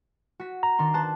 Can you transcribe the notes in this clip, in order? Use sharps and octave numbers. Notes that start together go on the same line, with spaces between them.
F#4 B6
A#5
D#3 D4 C6
C5 A5 F#6